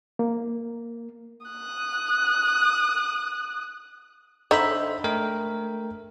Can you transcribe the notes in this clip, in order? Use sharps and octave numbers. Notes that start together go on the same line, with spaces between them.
A#3
D#6 F#6
D3 D#4 C5 E5 B5
A3 A#4 G5